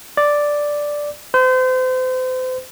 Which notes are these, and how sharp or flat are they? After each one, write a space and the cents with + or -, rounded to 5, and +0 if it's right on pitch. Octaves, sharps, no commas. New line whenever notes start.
D5 +0
C5 -35